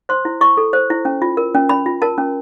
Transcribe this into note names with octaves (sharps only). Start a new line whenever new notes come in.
C5 C6
E4
E4 C#6
A4
C5
E4
C#4
F4
A#4
C#4
C#4 B5
F4
A#4 A5
C#4